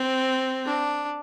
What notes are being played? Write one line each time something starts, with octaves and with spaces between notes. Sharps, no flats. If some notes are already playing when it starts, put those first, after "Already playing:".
Already playing: C4
D4